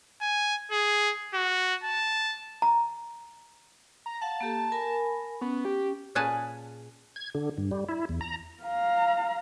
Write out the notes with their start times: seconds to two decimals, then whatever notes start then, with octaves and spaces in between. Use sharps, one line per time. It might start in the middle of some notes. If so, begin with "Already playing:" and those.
0.21 G#5
0.72 G#4
1.34 F#4
1.84 A5
2.62 A#5
4.06 A#5
4.21 F5 F#5 A5
4.41 A#3 G4 A4
4.72 A#4 G#5 B5
5.41 B3 C#4
5.65 G4
6.15 A#2 C#4 G#4 B4 G#5 A5
7.16 G#6
7.35 D3
7.58 G2
7.71 G3
7.89 E4
8.09 E2
8.21 A#5
8.64 F5 A#5